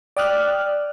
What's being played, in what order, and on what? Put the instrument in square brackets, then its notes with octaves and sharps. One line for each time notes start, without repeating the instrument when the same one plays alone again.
[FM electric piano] D5 G5 D#6 F6 F#6